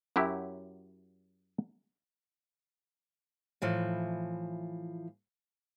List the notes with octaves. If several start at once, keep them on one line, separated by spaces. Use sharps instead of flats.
F#2 F#3 E4 G4
A2 E3 F3